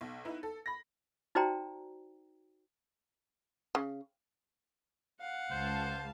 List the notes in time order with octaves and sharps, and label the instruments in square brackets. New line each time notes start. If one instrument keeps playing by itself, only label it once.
[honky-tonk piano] B1
D#4 E4 B4
A4
B5 A#6
[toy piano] D#4 F#4 C5 D5 G5 A#5
[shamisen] C#3
[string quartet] F5 [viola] F#5
[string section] C#2 A5 [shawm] C5